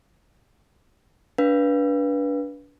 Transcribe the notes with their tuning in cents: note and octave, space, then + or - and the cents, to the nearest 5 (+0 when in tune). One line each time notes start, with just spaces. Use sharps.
D4 -25 B4 -20 F5 +0